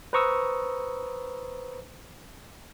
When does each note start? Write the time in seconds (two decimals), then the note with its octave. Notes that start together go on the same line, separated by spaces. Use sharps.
0.13 B4 C5 A#5 C#6 D#6 E6